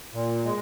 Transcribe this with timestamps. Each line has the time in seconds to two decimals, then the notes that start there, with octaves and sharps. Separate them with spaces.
0.13 A#2
0.45 G#3